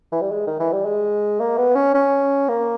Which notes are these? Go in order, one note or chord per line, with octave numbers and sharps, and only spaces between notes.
E3
G3
G#3
D#3
E3
G3
G#3
A#3
B3
C#4
C#4
A#3